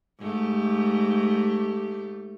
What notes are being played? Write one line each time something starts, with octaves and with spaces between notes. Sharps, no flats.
G#2 A3 G4